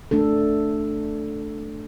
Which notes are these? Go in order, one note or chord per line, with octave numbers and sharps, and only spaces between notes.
A3 D4 A4